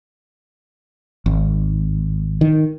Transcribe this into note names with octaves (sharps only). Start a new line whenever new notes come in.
G#1
D#3